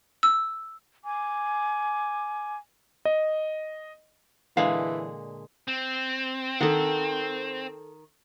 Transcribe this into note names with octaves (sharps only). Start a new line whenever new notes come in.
E6
G#5 D6
D#5
A#2 D3 E3 G#3 F5
C4
D#3 A4 F#5